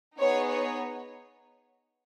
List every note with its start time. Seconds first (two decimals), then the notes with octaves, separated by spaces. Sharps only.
0.18 B3 D#4 G#4 C#5
0.48 C#5